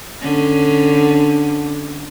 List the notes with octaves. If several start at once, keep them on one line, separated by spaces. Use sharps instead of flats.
D3 C#4